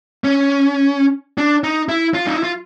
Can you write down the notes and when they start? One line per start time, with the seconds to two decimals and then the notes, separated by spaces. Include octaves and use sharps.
0.24 C#4
1.38 D4
1.64 D#4
1.89 E4
2.14 F4
2.27 D#4
2.35 E4
2.43 F4